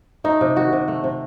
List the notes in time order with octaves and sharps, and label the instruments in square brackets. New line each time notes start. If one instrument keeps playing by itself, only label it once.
[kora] A3 D#4
C3
D#3 F#4
C3
A3
C3